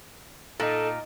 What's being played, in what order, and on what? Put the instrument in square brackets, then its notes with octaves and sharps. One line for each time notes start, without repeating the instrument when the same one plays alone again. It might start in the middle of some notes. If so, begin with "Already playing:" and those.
[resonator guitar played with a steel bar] A#2 [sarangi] D#4 [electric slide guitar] A4